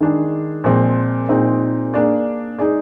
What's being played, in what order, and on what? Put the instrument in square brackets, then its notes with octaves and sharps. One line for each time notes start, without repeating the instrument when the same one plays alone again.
[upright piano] D#3 G#3 D4 G#4
A#2 F3 G#3 C4
A#2 G#3 C4 D#4
A#3 D4 G#4 D5
G#3 D#4 G#4 D5